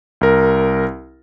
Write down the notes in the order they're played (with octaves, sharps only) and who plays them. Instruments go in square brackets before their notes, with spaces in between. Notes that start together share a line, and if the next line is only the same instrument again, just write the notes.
[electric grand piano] C2 A#4